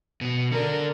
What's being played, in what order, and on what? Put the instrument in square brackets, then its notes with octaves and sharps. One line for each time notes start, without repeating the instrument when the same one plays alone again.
[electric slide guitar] B2 B3
[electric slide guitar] D3 D4 [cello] A#4